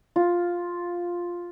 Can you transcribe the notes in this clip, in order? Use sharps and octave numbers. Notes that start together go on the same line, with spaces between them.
F4